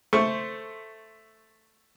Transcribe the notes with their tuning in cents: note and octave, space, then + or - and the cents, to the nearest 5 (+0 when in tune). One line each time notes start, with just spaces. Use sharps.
A3 +0 C5 +0 C#6 +0